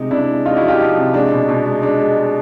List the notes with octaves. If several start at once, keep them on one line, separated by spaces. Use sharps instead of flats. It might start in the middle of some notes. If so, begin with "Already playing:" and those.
Already playing: C3 G#3 D#4
C3 D4 E4
G#3
G#3 D#4 F4
E4 F#4
F3
F4 G4
F3 D#4
C3
G#3 D4
B2
B2
G#3
G#3 D4
G#3
G#3